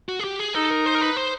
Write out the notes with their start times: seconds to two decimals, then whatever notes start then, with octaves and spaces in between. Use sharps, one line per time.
0.09 F#4
0.19 G#4
0.24 G4
0.39 G#4
0.54 D#4 A4
0.71 A#4
0.86 C5
0.95 A#4
1.01 B4
1.17 C5